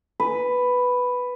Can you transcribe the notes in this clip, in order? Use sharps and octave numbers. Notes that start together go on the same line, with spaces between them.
B4